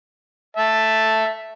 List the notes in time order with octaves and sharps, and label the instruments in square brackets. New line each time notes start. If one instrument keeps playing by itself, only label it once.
[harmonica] E5 A5